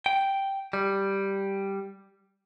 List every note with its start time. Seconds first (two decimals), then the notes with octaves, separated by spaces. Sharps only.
0.06 G5
0.73 G3